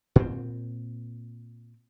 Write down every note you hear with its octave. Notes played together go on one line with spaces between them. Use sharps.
A#2 C4